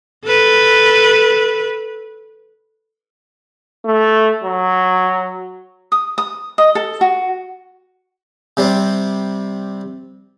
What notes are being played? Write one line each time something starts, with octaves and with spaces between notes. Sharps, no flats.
A4 B4
A3
F#3
D#6
D#6
D#5
A4
F#4
C3 G3 C4